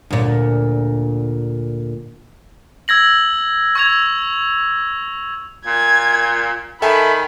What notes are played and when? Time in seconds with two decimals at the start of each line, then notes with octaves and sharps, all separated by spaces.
0.10 D2 A#2
2.88 E6 G#6 A#6 F#7
3.75 C#6 E6 G#6 F7
5.67 A#2 G#6
6.82 D#3 A4 E5 G#5 B5